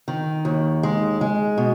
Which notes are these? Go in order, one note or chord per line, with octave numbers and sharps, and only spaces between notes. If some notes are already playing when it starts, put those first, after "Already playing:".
D#3
D#2
G#3
G#3
B2